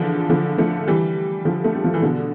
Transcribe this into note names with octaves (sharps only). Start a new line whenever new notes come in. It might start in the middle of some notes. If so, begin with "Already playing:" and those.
Already playing: D3 E3 F3
D3 F3
F3 A3
E3 G3
D3 F3
A3
G3
F3
E3
B2 D3